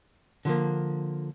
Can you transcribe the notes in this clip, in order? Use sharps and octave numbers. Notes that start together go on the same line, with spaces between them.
D3 F3 A#3